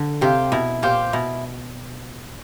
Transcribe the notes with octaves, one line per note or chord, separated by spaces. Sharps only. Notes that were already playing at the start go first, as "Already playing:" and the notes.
Already playing: D3
C3 G4 C5 F5
B2 E4
A#2 G4 C5 F5
B2 E4